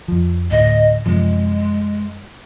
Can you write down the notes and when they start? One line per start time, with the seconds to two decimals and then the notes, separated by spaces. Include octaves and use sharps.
0.08 F2 F3
0.51 D2 A2 D#5
1.06 F#2 C3 F3 G#3